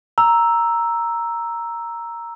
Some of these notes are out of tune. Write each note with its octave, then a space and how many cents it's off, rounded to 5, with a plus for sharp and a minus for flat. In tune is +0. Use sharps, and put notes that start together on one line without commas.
A#5 +0 E6 +0